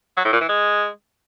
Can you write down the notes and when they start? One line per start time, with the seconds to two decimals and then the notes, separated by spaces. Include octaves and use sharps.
0.17 F#3
0.25 A2
0.33 A#2
0.41 E3
0.49 G#3